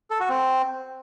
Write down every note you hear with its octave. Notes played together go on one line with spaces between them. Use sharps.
A4
F#4
C4